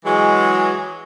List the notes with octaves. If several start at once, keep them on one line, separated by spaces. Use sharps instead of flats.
E3 F#3 G#3